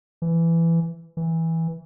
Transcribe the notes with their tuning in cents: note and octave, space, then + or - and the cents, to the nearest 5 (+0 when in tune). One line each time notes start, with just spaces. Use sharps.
E3 +15
E3 -10